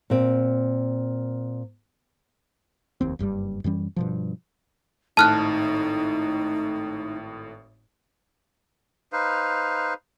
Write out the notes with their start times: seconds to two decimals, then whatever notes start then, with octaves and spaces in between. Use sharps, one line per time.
0.10 A#2 C4
3.01 F1 D#2 C4
3.19 F#1 G2 A#2 G3
3.64 F#2 E3 G3 C#4
3.96 G2 B2 F3
5.17 G#1 A2 D#4 A5 F6 F#6
9.13 D#4 B4 C5 F5